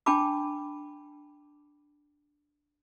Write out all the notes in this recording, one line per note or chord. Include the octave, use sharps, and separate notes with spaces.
D4 G5 A5 B5 D6